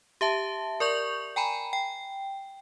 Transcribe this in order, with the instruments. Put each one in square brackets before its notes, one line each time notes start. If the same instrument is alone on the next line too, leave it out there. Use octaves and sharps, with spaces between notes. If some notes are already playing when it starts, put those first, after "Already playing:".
[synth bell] G4 E5 A5
A#4 D5 C#6 G6 F7 F#7
G5 G#5 A#5 B5
G5